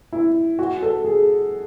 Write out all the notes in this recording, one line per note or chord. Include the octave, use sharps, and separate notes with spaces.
E4
F#4
A4
G#4